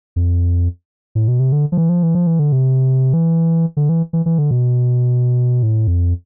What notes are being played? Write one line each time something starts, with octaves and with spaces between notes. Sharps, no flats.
F2
A2
B2
C3
D3
F3
E3
F3
E3
F3
E3
D3
C3
E3
D3
E3
E3
E3
D3
B2
A2
F2